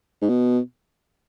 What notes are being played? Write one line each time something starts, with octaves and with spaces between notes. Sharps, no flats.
G#2
B2